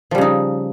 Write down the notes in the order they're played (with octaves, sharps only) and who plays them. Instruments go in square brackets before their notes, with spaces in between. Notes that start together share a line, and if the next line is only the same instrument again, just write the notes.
[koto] F3
G3
C#3
D#4